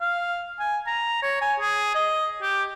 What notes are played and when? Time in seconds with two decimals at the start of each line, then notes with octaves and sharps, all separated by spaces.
0.01 F5
0.59 G#5
0.87 A#5
1.22 C#5
1.41 G#5
1.60 G#4
1.95 D#5
2.42 G4